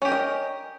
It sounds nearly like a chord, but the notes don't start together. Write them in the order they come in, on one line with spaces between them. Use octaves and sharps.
C#4 G4 A#4 D#5